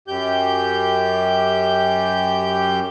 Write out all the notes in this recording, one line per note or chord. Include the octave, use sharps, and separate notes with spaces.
F#2 G4 G6